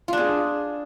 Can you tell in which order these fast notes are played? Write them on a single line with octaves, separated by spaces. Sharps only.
F4 D4 G#4